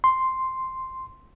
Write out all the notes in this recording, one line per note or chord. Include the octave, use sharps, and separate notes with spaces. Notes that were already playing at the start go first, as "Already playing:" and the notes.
C6